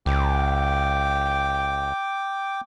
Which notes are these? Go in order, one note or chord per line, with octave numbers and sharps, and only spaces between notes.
C#2 G5 D6